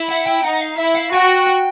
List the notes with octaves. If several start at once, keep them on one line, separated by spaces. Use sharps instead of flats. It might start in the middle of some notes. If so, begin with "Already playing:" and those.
Already playing: E4
F#5
G5
D#4 F#5
F5
E4 E5
F5
F#4 G5